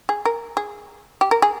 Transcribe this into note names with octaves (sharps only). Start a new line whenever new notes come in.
G#4
A#4
G#4
G4
A#4
G#4